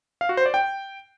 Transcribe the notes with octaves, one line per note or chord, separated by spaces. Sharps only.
F5
F#4
C5
D5
G5